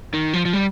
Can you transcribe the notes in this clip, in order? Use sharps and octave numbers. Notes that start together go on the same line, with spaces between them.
D#3
F3
F3
G3